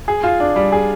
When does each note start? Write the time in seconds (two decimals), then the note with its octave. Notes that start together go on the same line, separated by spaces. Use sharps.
0.08 G#4
0.23 F4
0.40 D4
0.56 G3
0.72 G#4